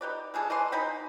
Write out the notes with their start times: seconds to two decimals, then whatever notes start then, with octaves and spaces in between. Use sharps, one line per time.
0.01 D#4 G4 B4 D5
0.34 G3 D4 G#4 A4
0.50 E3 D5 G#5 C6
0.72 B2 D#4 G5 B5